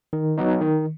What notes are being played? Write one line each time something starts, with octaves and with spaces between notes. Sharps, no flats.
D#3
F#3 B3 D#4
D#3